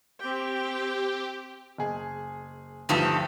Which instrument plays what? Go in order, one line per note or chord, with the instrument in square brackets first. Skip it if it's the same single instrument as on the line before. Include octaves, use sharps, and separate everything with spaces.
[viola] C4 G5 [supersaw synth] G4
[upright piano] F#1 G#4
[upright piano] D2 G2 F3 [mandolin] D#4 G4 A4